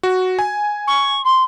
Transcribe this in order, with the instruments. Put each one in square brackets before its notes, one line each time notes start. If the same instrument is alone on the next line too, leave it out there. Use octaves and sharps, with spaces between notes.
[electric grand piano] F#4
G#5
[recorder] C#6
C6